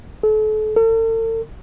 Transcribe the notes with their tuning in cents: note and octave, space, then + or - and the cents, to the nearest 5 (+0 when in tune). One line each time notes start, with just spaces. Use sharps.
A4 -35
A4 +45